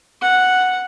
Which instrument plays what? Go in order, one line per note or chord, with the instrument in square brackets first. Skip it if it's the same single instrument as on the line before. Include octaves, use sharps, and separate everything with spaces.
[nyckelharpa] F#5